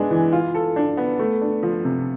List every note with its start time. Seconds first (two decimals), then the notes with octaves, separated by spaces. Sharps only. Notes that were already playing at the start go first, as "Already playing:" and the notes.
Already playing: G#3 B3 D4
0.11 E3
0.33 F4
0.54 A4
0.76 D4
0.97 B3
1.19 A3
1.41 D4
1.63 F3
1.84 C3